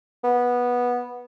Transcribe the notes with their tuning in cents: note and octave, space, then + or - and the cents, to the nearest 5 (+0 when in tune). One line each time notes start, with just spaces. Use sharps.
B3 -10